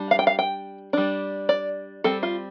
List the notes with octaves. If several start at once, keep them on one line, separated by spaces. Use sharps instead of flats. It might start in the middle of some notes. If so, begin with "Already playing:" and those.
Already playing: G3 D4
F5
G5
F5
G5
G3 D4
D5
G3 C4 A4
F4